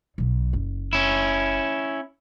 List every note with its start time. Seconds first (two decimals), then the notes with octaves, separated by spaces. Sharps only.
0.18 B1 B2
0.53 F#1
0.93 C#4 E4